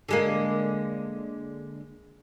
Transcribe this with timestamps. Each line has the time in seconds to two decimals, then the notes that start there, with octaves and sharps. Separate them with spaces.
0.09 D3 G#3 A#3